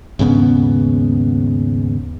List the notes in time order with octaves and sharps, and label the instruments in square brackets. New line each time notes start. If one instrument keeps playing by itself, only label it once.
[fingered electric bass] D#2 G#2 C#3 B3